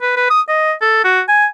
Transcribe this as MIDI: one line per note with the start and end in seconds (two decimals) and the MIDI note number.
0.02 0.15 71
0.17 0.30 71
0.30 0.41 87
0.49 0.73 75
0.82 1.03 69
1.05 1.21 66
1.28 1.47 80